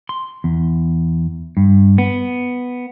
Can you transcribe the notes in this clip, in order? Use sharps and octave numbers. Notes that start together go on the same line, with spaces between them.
C6
E2
G2
B3